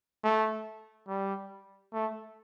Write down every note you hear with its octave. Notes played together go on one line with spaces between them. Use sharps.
A3
G3
A3